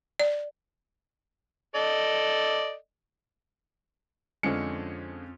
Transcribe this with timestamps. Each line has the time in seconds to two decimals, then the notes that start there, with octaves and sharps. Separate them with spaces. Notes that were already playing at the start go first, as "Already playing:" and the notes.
0.20 D5
1.75 A4 D5 D#5
4.43 F2 D3 F3 G#3 C#4 C#7